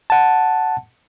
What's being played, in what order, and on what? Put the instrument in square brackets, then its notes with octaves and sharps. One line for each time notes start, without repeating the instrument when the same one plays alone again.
[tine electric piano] F#5 A5